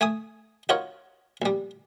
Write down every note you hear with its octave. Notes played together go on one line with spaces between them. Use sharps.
A3 G#5 D#6
D#4 F4 F#4 A#4 C#5
A#1 G3